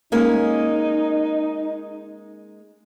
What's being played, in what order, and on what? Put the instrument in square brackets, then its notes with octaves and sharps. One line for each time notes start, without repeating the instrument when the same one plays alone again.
[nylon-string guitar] G#3 A#3 C#4 [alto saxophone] D#4